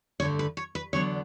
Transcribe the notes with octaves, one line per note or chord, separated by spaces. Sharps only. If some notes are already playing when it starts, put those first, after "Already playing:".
G2 D3 A3 C#5
B4
C#5
B4
E2 D3 F#3 B3 D4 C#5